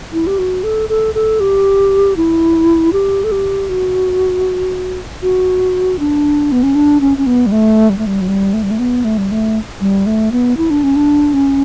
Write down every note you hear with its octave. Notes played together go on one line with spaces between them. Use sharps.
E4
G4
F#4
A4
A4
A4
G4
E4
G4
A4
G4
F#4
F#4
D4
B3
C#4
D4
C#4
C#4
B3
G3
A3
G3
A3
G3
F#3
G3
A3
G3
A3
B3
A3
G3
A3
G3
A3
B3
E4
D4
C#4
D4
C#4